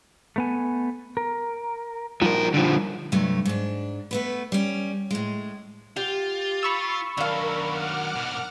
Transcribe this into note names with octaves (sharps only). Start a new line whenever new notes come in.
A3 B3 G#5
A#4
F3 G3 D#4 F#4 A#4
D3 F3
G2 C3 F#3 A3
G#2 D4
A3 B3 B4
G3 C#4
A2 G#3
F4 G4
B5 C#6 E6
D#3 F#3 D4 A#4 F5
F#5 D6 F6
G#2 B2